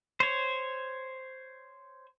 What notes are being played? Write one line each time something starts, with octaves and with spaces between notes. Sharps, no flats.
C5 C#5